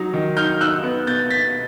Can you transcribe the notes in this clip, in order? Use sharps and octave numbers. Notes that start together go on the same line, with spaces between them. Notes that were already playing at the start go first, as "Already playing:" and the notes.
Already playing: F#3 D#4
D#3
D#4 F6 G6
D#4 E6 F#6
B3
B2 G6 A6
B2 A6 B6